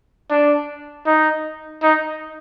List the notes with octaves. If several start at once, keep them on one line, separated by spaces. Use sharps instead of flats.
D4
D#4
D#4